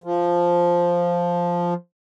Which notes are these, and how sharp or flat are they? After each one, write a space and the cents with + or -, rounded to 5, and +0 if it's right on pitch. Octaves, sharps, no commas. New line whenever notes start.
F3 +0